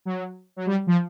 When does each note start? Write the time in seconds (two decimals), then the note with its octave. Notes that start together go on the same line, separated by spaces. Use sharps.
0.05 F#3
0.56 F#3
0.66 G3
0.87 F3